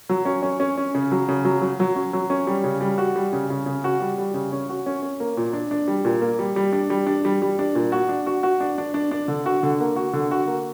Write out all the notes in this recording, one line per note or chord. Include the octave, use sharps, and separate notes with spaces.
F#3
C#4
C#4
C#4
C#4
C#3
F#3
C#3
F#3
F#3
F#3
C#4
F#3
C#4
G3
C#3
G3
F#4
G3
C#3
C#3
C#3
F#4
G3
G3
C#3
C#4
F#4
C#4
C#4
A#3
A#2
D4
D4
G3
A#2
A#3
G3
G3
D4
G3
D4
G3
G3
D4
A#2
F#4
D4
F#4
F#4
D4
D4
D4
D4
D3
F#4
D3
A#3
F#4
D3
F#4
A#3